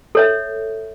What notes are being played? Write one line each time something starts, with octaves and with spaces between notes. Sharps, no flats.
A4 C#5 E5